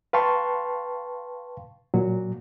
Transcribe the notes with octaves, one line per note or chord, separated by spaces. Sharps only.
B4 F5 G5 A5 C6 C#6
A#2 F#3